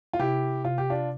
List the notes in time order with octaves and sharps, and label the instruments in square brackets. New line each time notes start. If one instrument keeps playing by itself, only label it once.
[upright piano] F4
[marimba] C3 [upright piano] E4 G4
[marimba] C3 [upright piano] F4
[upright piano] G4
D4 F4